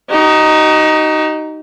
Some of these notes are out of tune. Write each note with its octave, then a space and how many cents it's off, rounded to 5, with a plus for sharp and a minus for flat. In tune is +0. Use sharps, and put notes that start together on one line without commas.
D#4 +0 F#4 +45